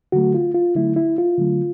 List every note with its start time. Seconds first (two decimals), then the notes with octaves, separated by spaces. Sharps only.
0.12 D3 F#3 A3 F#4
0.34 F4
0.54 F4
0.75 D3 F#3 A3 E4
0.96 E4
1.18 F4
1.38 D3 F#3 A3